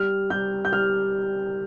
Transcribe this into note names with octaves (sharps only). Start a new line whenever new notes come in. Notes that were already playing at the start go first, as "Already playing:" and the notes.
Already playing: G3 F6
G3 G6
G6
G3 F6